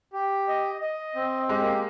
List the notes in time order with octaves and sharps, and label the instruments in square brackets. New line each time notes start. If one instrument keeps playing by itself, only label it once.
[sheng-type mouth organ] G4
D#5
D#5
C4
[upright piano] G#3 [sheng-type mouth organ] G4
[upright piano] A#3